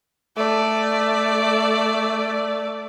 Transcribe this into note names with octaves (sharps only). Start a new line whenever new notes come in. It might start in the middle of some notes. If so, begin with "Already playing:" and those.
A3 D5